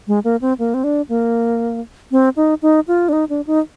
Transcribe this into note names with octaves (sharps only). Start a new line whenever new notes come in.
G#3
A#3
C4
A#3
C4
D4
A#3
C4
D#4
D#4
F4
D4
D#4
D4
D#4